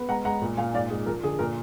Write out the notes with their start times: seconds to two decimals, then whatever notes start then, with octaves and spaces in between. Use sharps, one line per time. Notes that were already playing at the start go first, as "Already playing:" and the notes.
Already playing: B3
0.08 G#3 F#5 A#5
0.25 G#3 F#5 A#5
0.42 A#2
0.57 A#2 F5 G#5
0.74 G#2 D5 F5
0.90 G#2 G#4
1.06 F3 A#4
1.23 D3 G#4
1.39 A#2 A#4